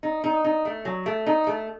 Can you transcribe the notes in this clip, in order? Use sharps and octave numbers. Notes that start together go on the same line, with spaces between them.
D#4
D#4
D#4
A3
F#3
A3
D#4
A3